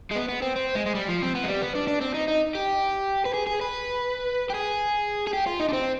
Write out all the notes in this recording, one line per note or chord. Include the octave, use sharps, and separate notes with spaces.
G#3
B3
B3
C4
C4
G#3
G#3
G3
F3
C4
B3
G#3
G3
B3
D4
D4
C4
D#4
D#4
G4
B4
G#4
G#4
B4
G4
G#4
G#4
G4
F4
D#4
D4
C4